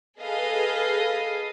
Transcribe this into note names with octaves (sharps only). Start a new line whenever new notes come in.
G#4 A4 B4 D#5 F5